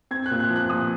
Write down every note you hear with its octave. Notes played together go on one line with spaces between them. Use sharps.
C4 G#6
F#6
A#2
F#6
F3
F#6
A#2 D#6